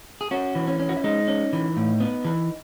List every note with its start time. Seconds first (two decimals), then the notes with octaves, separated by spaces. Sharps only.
0.21 G#4
0.31 C#4 F#4
0.55 E3
0.67 C#4
0.79 C#4
0.89 F#4
0.97 E4
1.04 G#3 D#4
1.28 C#4
1.53 E3
1.77 A2
2.00 B3
2.25 E3